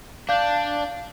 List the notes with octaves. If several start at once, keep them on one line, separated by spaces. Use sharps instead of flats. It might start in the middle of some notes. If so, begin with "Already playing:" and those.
D4 F5 G6